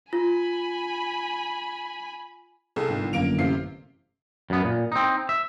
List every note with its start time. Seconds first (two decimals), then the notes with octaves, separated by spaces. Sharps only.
0.13 F4 G#5 B5
2.76 C2 G#4 A4
2.89 G1 G#2
3.13 G#1 F#2 D3 A#3 D7 F7
3.38 A1 C3 F5 C7
4.50 F#2 B3
4.65 A#2
4.92 C4 D#4
5.29 E5